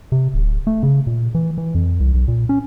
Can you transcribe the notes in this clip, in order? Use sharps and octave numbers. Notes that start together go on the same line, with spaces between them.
C3
D1
A3
C#3
A#2
E3
E3
F2
C2
B1
A#2
C#4